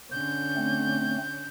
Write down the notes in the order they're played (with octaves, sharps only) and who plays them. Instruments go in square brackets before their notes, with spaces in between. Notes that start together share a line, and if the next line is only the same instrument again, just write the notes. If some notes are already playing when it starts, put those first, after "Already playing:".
[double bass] D3 C#4 [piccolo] G6
[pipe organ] A3 C4